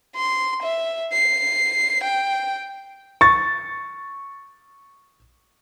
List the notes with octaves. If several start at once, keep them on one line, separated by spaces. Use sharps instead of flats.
C6
E5
C7
G5
C#6 A6